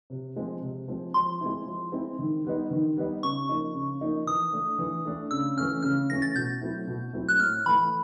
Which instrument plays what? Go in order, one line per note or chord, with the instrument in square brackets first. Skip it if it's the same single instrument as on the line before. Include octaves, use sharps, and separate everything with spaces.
[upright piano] C3
F3 G#3 C4
C3
F3 G#3 C4
[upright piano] F3 [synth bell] C6
[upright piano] G#3 C4 E4
F3
G#3 C4 E4
D#3
G3 B3 D#4
D#3
G3 B3 D#4
[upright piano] C#3 [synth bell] C#6
[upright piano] F3 A#3 D#4
C#3
F3 A#3 D#4
[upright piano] E3 [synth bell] D#6
[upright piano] A3 D4
E3
A3 D4
[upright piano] C#3 [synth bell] E6
[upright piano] E3 A3 C#4 [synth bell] F6
[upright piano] C#3 [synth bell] F6
[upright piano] E3 A3 C#4 [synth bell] A#6
[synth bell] A6
[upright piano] B2 [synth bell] G6
[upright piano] F#3 A3 C4 E4
B2
F#3 A3 C4 E4
[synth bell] F#6
[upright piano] A2 [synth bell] F6
[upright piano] E3 A3 [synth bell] B5